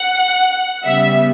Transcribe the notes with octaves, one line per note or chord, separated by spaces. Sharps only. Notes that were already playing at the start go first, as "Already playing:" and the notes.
Already playing: F#5
C#3 G3 B3 E5